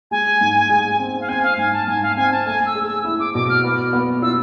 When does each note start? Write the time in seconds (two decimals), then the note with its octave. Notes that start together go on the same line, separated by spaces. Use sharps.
0.11 G#3 G#5
0.41 G#2
0.69 G#3
0.99 C4
1.20 F5
1.28 C4 G#5
1.43 F5
1.58 G#2 G#5
1.73 A5
1.87 G#2 G#5
2.02 F5
2.16 C4 G#5
2.31 A5
2.46 A3 G#5
2.65 E6
2.75 G#4
2.85 E6
3.04 E4 E6
3.19 D6
3.34 B2 D6
3.49 F6
3.63 B3
3.93 B3
4.22 F4 E6